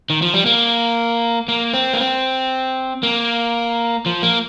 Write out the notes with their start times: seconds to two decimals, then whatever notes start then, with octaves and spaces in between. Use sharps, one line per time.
0.10 D#3
0.22 F3
0.34 G3
0.46 A#3
1.48 A#3
1.74 C4
1.94 A#3
2.00 C4
3.03 A#3
4.06 F3
4.22 A#3